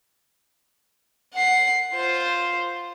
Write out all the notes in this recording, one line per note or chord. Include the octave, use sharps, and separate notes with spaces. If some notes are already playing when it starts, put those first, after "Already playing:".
F#5 C7
F4 C5